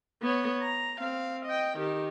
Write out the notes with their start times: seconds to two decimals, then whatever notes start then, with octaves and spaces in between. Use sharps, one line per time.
0.22 B3 C#5
0.62 A#5
0.99 C4 F5
1.45 D#5 G5
1.78 D#3 G4